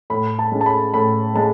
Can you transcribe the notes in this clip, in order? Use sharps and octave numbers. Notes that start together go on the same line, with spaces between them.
A2 B5
A5
G#3 C#4
A5
B5
A2 B5
G#3 A5